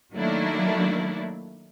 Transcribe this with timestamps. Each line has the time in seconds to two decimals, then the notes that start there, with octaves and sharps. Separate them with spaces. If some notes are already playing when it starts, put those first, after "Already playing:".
0.14 D#3 F#3 A3 A#3 D4 E4